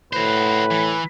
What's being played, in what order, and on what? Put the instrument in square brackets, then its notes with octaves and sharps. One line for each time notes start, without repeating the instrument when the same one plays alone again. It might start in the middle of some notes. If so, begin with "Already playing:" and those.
[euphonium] A2 [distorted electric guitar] F#4 C5 [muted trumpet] B4
[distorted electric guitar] E3